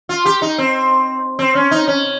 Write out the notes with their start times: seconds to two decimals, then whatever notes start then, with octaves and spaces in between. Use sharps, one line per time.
0.09 F4
0.26 G4
0.42 D#4
0.58 C4
1.39 C4
1.55 C#4
1.71 D#4
1.88 C#4